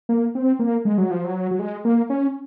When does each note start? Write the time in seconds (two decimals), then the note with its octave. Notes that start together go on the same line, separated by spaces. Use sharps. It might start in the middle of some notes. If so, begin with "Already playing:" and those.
0.09 A#3
0.35 C4
0.59 A#3
0.85 G#3
0.98 F#3
1.11 F3
1.24 F#3
1.51 F#3
1.59 G#3
1.85 A#3
2.10 C#4